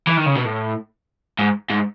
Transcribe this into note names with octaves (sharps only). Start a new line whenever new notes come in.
E3
D#3
C#3
B2
A2
G#2
G#2